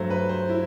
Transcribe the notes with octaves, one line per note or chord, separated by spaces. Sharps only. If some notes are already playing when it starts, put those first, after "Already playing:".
Already playing: G2 F#3 A3 C5
B4
C5
E4